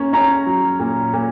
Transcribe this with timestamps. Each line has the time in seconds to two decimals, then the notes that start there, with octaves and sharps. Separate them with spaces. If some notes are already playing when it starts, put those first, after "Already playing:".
Already playing: A#3 C#4
0.13 C#4 A#5
0.46 F#3
0.80 A#2
1.13 A#2